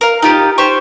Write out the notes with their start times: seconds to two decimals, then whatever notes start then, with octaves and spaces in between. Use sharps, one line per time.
0.01 A#4 F5
0.22 D#4 F4 G4
0.58 G4 C5 C#6